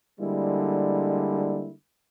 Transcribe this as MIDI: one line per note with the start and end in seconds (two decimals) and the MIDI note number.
0.20 1.71 50
0.20 1.71 55
0.20 1.71 56
0.20 1.71 58
0.20 1.71 64